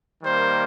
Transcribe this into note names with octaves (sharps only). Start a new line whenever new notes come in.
D#3 G3 A#3 C5